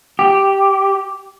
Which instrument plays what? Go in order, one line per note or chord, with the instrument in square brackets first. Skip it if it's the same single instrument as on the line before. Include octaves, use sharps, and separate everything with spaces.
[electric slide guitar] G4